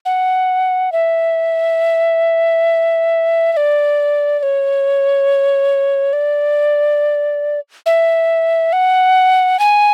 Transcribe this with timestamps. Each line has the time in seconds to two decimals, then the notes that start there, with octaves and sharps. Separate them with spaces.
0.05 F#5
0.92 E5
3.52 E5
3.57 D5
4.39 D5
4.43 C#5
6.13 D5
7.86 E5
8.73 F#5
9.59 G#5